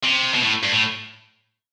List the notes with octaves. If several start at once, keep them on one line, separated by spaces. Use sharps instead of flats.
C3
B2
A2
G2
A2